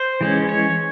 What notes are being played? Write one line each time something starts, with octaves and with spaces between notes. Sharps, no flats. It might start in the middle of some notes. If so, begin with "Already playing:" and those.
Already playing: C5
E3 G#3 C#4
C#5